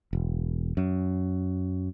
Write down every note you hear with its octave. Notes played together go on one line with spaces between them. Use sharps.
E1
F#2